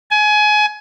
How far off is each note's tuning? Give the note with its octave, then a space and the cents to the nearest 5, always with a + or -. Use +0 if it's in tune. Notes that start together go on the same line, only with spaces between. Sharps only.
G#5 +25